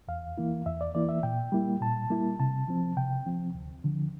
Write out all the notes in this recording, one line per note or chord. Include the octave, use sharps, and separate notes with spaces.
E2 F5
E3 A#3 E4
E2 E5
D5
E3 A#3 E4 D5
E5
A#2 G5
G3 A#3 E4
A#2 A5
G3 A#3 E4
C3 A5
F3 C4
C3 G5
F3 C4
D2
D3 F3